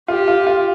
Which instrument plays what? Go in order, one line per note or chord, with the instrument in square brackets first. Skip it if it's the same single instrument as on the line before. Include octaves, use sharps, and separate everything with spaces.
[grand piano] F4 [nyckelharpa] G4
[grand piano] F4
F4